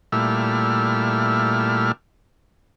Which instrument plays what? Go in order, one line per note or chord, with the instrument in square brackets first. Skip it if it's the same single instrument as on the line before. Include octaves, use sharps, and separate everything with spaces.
[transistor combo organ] A#2 G3 A3 E4 F6